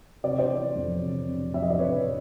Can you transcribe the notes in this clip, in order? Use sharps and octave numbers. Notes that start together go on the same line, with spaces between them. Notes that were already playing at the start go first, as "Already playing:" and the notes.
C3 D5
C#5
C5 D5
E3
F2
C3
C3
F2 E5
D#5
D5
C3 B4 C#5